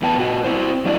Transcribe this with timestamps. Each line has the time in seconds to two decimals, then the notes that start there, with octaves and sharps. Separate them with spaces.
0.02 E2 B3 G5 A5
0.18 A#2 F#4
0.44 C4 E4 C5
0.85 F#3 D4 E4 D5